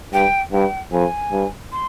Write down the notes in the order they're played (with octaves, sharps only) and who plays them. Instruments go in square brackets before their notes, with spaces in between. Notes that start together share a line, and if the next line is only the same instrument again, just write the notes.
[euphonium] G2 [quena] G5
[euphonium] G2 [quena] G5
[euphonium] F2 [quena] G#5
[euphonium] G2
[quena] C6